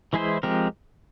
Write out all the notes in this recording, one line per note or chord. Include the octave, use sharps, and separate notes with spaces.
E3 G#3 E4 G#4 C5
F3 G#3 C4 G4 A#4